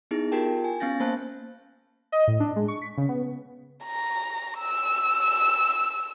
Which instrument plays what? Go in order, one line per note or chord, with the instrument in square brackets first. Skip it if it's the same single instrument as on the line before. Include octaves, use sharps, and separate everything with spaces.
[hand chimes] B3 D#4 E4 G#4
F4 G4 A#4 G5 A5
G#5
B3 C#4 F5 G6 A6 A#6
A#3 C5 A5 F#6
[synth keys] D#5
A2
D4
G#3
C#6
B6
C#3
B3
[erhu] A#5
E6